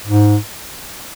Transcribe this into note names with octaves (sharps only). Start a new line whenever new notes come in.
G#2